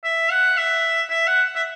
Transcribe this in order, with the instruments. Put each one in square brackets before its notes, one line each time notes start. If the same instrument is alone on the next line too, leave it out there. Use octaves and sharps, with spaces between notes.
[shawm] E5
F#5
E5
E5
F#5
E5